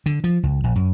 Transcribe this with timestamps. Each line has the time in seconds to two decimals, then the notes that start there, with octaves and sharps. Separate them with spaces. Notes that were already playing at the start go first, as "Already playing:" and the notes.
0.06 D3
0.24 F3
0.43 C#2
0.64 A#1
0.76 F#2